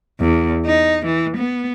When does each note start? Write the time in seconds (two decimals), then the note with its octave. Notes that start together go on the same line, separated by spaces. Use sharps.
0.20 E2
0.66 D#4
1.06 E3
1.37 B3